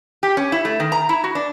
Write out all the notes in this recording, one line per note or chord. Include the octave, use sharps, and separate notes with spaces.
G4
C#4
E4
A3
D#3
A#5
E4
F#4
D4